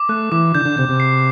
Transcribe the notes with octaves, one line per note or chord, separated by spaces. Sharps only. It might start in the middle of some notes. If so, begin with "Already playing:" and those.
Already playing: D6
A3 F#6
E3 D6
D3 G6
D3
C3 G6
C3
C7